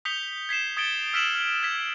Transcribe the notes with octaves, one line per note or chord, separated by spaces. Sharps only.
D#6 G6 B6 C#7 F7 G7
G#6 B6 C7 E7
D#6 G#6 A6 C#7 D7 G7
E6 F6 B6 D7 E7 F#7
F6
G#6 B6